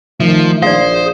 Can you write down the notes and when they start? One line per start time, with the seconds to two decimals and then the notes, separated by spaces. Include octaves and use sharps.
0.20 D#3 F3 A3
0.62 A#1 G#4 C5 D5 F5